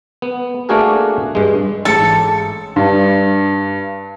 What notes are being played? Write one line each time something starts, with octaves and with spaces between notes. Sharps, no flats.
B3
A3 A#3 D4 F#4 G#4 A#4
G2 G#3
A1 G#2 A4 C#7
G2